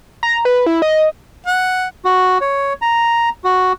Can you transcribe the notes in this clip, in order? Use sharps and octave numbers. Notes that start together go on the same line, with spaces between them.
A#5
B4
E4
D#5
F#5
F#4
C#5
A#5
F#4